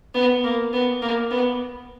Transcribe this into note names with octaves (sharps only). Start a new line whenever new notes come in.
B3
A#3
B3
A#3
B3